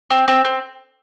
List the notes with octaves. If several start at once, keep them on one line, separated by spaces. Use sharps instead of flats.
C4
C4
C4